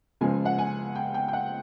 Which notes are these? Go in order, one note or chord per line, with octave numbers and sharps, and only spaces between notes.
C#2 C#3 F3 G#3 G#5
F#5
G#5
G5
G5
G5
F#5